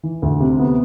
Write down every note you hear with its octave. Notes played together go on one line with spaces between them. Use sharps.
E3
D2
C3
B3